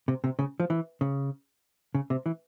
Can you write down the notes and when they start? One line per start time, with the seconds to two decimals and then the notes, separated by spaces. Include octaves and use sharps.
0.08 C3
0.24 C3
0.39 C#3
0.60 F3
0.70 E3
1.01 C#3
1.95 C#3
2.10 C3
2.26 E3